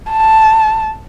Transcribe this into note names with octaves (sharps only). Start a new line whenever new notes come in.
A5